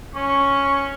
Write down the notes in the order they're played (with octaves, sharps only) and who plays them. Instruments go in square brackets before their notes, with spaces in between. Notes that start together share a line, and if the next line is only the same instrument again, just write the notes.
[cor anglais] C#4 [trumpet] C#6